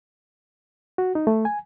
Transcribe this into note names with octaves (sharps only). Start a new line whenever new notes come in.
F#4
D#4
A3
G#5